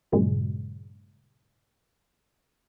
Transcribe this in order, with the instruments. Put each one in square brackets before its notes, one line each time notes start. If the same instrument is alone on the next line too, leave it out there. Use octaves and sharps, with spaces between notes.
[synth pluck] G2 A#2 C#3 F#3 G#3